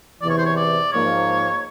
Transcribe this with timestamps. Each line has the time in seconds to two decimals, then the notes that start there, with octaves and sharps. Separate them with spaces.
0.21 E2 C3 E3 D5
0.30 C#5
0.38 C5
0.46 C#5
0.56 D5
0.92 G#2 F3 A#3 C#5